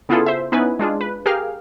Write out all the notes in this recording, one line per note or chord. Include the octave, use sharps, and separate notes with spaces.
C#3 B3 E4 F4 G#4 A4
C5 E5
B3 C#4 D#4 E4 B4 G#5
G#3 D4 F4 G#4
B4
G4 G#4 A#4 F5 G5 F6